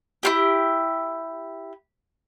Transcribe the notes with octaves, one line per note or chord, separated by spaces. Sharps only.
E4 F4 G4